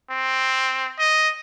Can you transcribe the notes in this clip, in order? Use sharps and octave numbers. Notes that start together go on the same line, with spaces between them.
C4
D#5